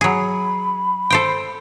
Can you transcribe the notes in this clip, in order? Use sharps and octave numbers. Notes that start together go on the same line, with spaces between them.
F#3 G#4 B5
A4 C5 G5